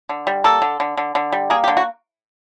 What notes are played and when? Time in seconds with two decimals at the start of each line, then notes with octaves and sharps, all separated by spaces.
0.09 D3
0.27 G3
0.44 A#3 A4
0.62 D3
0.80 D3
0.97 D3
1.15 D3
1.32 G3
1.50 A#3 G#4
1.64 G4
1.68 D3
1.77 F#4